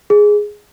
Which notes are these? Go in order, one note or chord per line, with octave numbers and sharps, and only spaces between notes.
G#4